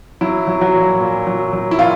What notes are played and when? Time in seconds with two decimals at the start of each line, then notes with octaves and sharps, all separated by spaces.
0.21 F#3 E4
0.47 F#3
0.61 F#3 F#4
0.74 A#2
1.00 A#2
1.27 F#3
1.53 F#3
1.71 E4
1.79 A#2 F4